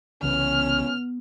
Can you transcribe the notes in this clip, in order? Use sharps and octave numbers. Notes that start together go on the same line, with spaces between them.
C2 C#3 E3 B3 C#4 F6